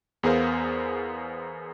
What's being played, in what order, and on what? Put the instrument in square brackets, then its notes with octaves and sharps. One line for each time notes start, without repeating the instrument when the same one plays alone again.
[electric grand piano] E2 B3 G#4 A#4 C5 F5